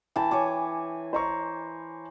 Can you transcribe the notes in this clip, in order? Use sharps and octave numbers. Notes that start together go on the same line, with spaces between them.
E3 G5 A5
C#5 G#5 D6
C5 A#5 C#6